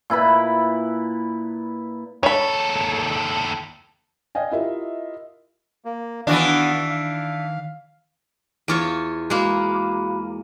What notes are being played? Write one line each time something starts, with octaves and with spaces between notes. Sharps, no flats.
A#2 E4 B4 B5
D#2 A4 C#5 B5
D5 D#5 F5 G5 G#5
E4 F4 G4 A#4 D#5 E5
A#3
D#3 E3 B3 D4 F#4 F5
F5
E2 F4 C#5
G#3 A#3 F#4 F5 B5